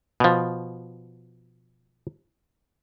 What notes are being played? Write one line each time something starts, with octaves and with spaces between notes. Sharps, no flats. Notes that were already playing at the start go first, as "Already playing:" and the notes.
B2 F3